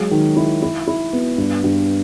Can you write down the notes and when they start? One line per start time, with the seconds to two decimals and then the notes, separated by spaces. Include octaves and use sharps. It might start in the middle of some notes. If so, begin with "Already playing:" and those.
Already playing: F#3 G#3
0.11 D#3
0.36 E4
0.62 E4
0.88 E4
1.13 B3
1.38 G2
1.64 G2